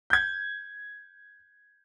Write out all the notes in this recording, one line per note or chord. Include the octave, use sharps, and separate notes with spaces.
G6 G#6